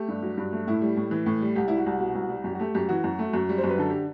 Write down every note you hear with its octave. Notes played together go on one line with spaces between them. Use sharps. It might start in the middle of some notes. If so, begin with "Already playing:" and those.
Already playing: A3 G4
G2
F#3
G2
A3
A2 E4
G3
A2
E3
A2
G3
C2 G4
G3 E4
F#4
C2
B2
C2
G3
F#2 G4
F#4
A3 G4
F#2 G4
E3 F#4
F#2
A3
F#2
G3
C5
F#2
B4
D3 A4
G4